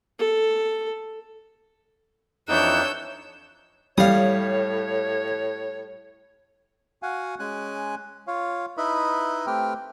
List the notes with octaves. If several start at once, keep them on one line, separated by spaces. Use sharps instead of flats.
A4
F2 E3 D4 D#4 C#5 E6 F#6 G6
A2 G3 C#5 F5 D#6
F#4 F5 F#5 G#5
G#3 C#4 G#5 F#6
F4 C#5 F5
D#4 E4 B4 D#5 E5 B5
A3 C4 G4 B4 G5 F6